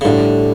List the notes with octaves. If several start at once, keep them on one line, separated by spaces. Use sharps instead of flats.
C#3
A2 D3 G3 D4